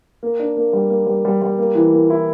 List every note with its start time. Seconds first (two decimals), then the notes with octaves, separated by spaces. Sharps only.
0.23 A#3
0.40 D4
0.57 A#3
0.73 G3
0.90 A#3
1.07 G3
1.25 G3
1.42 G3
1.59 A#3
1.75 E3
1.93 A#3
2.10 E4